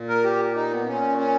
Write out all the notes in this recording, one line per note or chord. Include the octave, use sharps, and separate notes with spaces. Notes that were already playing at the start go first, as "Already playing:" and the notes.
Already playing: A#2
A#4
G4
D#4
B3
A#2 C#4
C#4